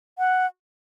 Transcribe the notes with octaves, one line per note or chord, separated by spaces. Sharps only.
F#5